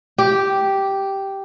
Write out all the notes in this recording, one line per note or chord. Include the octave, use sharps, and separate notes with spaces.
G4